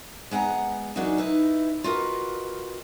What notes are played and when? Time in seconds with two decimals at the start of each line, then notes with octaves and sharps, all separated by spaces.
0.31 G#3 B3 F#5 G#5 A#5
0.96 E2 F#3 A#3 D4 D#4
1.18 D#4 E4 B4
1.84 F4 F#4 A#4 B4 D#5